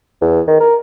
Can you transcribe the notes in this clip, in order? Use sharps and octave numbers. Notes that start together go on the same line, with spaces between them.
E2
D#3
A#4